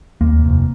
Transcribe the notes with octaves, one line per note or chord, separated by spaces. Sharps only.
D#2 A#3
F1